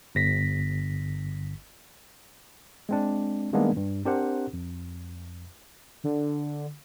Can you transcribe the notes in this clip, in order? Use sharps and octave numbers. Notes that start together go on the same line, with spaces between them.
G1 A#6 B6
G#3 C4 D4
D#3 G3 G#3 A#3 B3 D4
G2
C4 D4 G4 A#4 C5 F#5
F2
D3